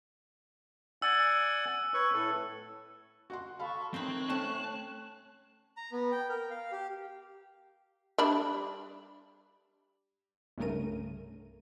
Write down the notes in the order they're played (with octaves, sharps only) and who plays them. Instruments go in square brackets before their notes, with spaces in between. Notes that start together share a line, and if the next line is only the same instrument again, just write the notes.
[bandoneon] D5 F#5 G#5 [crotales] E6
[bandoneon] B4 C#5 C#6
A2 A4
[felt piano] F#4 F#5 C6
[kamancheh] A4 C#6 [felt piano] F5 B5
[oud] D#3 E3 D#4 [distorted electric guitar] C4 [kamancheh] C#5 F#6
[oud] A3 C4 [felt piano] C#4 [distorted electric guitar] A5
[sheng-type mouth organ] A#5
B3
G5
A#4
F5
G4
[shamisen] G3 D4 B5
[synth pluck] C2 G2 C#3 A3 A#4 D#7